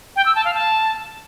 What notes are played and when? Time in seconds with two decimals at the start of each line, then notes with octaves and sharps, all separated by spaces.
0.16 G5
0.26 E6
0.35 A5
0.45 F5
0.54 A5